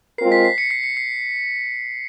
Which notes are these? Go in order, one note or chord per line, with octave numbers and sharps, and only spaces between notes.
G#3 C4 F4 A#4 C7
B6
C7
C#7
C7
C#7
C7